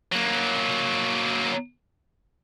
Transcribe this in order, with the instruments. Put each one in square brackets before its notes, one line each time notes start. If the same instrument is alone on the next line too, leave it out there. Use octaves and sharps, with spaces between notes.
[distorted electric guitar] F#3 A#3